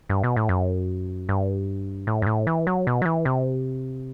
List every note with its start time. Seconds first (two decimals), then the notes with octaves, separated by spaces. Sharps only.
0.09 G2
0.24 B2
0.36 A2
0.49 F#2
1.29 G2
2.07 A2
2.22 G2
2.27 A2
2.47 E3
2.67 F#3
2.87 B2
3.02 F#3
3.05 E3
3.25 C3